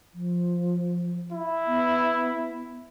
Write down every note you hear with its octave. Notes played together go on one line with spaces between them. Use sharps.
F3
E4
B3